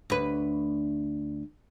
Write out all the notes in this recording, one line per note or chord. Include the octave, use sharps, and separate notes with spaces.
D2 B4